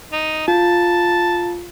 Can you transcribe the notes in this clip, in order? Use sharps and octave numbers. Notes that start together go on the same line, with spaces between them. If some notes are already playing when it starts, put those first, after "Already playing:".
D#4
F4 A5